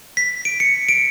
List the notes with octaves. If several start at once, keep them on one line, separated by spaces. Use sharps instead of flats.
B6
D7
C#7
D7